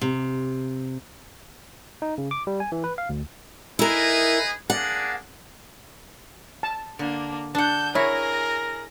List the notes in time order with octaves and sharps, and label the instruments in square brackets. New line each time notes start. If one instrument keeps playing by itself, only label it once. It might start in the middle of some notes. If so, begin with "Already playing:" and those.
[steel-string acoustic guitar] C3
[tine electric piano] D#4
C#3
D6
G3
G#5
E3
B4
F5
D2
[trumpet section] D#4 G#4 B4 [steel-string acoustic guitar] E4 A#4
[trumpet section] A#3 D4 G#4 [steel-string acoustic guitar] F#5
[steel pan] A5
[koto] D3 [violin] A#3 D4
[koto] D4 F#5 [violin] A4 G6
[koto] E4 [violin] G#4 A#6 [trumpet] A#4 [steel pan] C#5